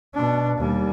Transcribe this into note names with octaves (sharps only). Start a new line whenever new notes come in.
B2 D4
D#2 G3